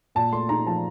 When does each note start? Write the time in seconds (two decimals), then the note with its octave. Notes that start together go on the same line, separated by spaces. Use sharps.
0.15 A#2 A5
0.32 A3 C6
0.49 D#4 A#5
0.66 F3 A5